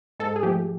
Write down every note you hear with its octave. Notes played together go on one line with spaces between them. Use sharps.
G#2 A4
G#4
F3 A3 G4